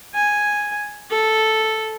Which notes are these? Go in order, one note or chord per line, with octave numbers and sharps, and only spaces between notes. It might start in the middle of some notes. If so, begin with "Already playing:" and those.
G#5
A4